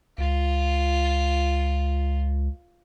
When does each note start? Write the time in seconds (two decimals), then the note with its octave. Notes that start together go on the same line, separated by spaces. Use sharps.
0.18 C#2 F4